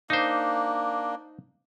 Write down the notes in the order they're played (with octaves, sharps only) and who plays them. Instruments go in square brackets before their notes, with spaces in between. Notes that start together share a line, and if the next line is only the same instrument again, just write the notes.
[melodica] A#3 D4 [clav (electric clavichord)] D#4 C5